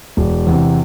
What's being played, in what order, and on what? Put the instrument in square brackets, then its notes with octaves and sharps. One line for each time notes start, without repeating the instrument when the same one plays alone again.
[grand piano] E1
E2 C3